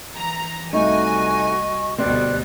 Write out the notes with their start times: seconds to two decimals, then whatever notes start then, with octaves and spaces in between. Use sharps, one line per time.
0.15 E3 A#5
0.73 C2 A3 D#4 F#4 D#5 G#5 C#6
1.98 D2 B2 G3 C4 D5 F#6